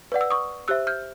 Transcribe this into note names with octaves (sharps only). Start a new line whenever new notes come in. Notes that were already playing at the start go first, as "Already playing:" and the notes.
B4 D5 F#5
E6
C#6 D#6
G4 C5 E5 E6 F#6
F6 G6